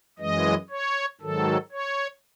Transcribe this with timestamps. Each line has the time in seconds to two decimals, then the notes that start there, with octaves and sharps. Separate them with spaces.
0.19 F#2 E3 G#3 D#5
0.70 C#5
1.21 G#2 D#3 F#3 A4
1.72 C#5